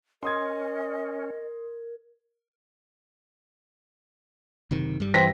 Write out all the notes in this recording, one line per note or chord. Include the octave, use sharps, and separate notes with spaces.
C#4 A#4 D#5 C6 D#6 G#6
F#1 C3 D#3
G2 G3
E3 C4 A#6 B6